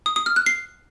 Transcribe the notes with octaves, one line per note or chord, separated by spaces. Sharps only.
D#6
D#6
F6
F#6
C7